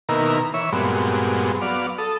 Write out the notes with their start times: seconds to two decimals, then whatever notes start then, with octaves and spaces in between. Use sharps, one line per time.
0.09 B2 D#3 A#3 E4 A#4
0.54 E3 C#5 E5
0.72 G2 A#2 F#3 G#3 B3 C4
1.62 F#3 B3 D5 F5
1.98 A4 D#6